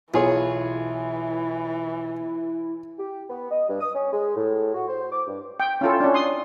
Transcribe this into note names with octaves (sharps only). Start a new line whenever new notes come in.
B1 E3 E4 F4 G#4 C#5
G4
B3
D#5
G2
D#6
C#4
G#3
A2
F#4
C5
D6
G2
G5
C#4 E4 F4 A4
C#4 D4
C6 D#6